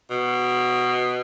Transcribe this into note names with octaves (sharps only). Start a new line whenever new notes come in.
B2